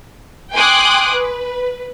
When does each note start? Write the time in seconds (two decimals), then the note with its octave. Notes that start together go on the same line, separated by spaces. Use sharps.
0.54 G5 G#5 C6 D6 D#6 F#6
1.12 B4